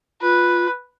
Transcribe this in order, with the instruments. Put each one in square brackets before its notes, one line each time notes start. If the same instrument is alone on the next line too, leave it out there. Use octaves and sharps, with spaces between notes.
[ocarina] F4 [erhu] B4